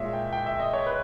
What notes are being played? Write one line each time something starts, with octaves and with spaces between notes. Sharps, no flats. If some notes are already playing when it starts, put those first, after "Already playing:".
Already playing: A#2 G#3 C#5 E5
G5
G5
E5
D#5
C#5
B4